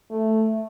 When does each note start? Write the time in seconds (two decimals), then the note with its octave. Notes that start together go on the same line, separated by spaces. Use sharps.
0.10 A3